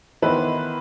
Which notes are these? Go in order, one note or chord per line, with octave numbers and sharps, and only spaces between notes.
D#3 E3 B3 E4 B4 C5